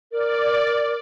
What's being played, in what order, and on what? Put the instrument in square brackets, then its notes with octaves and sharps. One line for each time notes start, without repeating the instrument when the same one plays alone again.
[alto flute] A#4 [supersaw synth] D5